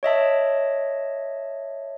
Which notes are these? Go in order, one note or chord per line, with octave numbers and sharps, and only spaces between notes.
C#5 D#5 E5 A5